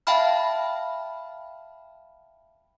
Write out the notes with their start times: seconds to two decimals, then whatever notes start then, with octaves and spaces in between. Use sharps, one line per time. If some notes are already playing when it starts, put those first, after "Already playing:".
0.07 E5 F5 G5 A5 B5 F6